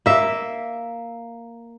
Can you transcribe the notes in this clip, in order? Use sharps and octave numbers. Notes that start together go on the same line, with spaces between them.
A#3 E5